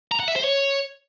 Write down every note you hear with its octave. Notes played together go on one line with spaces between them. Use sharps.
A#5
F#5
E5
C5
C#5